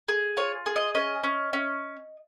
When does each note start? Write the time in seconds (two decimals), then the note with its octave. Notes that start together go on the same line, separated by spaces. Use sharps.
0.08 G#4
0.37 F4 C#5
0.66 G#4
0.76 D#5
0.95 C#4 D#5
1.24 C#4
1.53 C#4